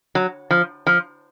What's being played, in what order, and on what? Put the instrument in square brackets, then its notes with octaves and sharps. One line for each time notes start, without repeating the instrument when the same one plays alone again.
[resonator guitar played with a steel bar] F#3
F3
F3